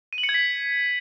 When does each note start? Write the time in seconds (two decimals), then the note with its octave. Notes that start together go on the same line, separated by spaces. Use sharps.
0.13 D#7
0.18 F#7
0.23 C#7
0.29 G#6
0.34 B6